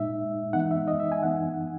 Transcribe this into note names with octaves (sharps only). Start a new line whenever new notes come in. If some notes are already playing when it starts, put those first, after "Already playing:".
Already playing: A#2 G#3 D#4 E5
E3 G#3 B3 D#4 F#5
E5
D#5
E5
G#5
E3 B3 D#4 F#5